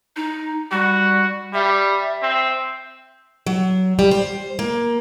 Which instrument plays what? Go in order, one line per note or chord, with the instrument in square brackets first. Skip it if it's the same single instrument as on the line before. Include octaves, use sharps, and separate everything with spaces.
[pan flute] D#4
[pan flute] G3 [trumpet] F#4
[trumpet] G3 [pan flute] E5
[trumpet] C4
[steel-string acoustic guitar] F#3
G3
C5
A#3